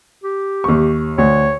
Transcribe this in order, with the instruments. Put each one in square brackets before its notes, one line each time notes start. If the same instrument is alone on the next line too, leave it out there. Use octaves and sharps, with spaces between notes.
[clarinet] G4
[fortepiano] D#2 C#6
[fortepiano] D2 [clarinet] C#5